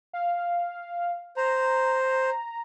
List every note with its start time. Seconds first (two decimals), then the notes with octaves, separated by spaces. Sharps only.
0.13 F5
1.37 C5 A#5